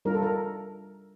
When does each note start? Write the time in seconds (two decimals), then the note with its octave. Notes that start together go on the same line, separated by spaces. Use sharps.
0.05 G3 D4 F4 A#4
0.14 A4
0.23 A#4